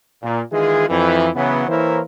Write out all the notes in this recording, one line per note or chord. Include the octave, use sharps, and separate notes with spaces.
A#2
D#3 E3 G#3 F4 G#4
F2 E3
C#3 E3 F#3 B3
E3 A#3 E4 A#4 C5 C#5